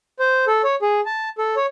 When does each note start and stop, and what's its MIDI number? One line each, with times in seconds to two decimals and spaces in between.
0.19 0.45 72
0.47 0.62 69
0.64 0.75 73
0.82 1.00 68
1.06 1.29 81
1.38 1.55 69
1.56 1.66 73